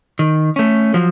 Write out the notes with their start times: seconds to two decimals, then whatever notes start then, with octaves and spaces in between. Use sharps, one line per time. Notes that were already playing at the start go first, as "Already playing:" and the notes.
0.19 D#3
0.56 A3 C#4
0.94 F3 F#3